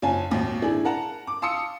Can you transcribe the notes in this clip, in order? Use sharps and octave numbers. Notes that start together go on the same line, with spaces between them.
F#1 C#4 F4 G#5 A5
G#1 D#2 A#2
D4 E4 G#4
A#4 F#5 A5 A#5
D6
F5 A5 C6 D#6 E6 C#7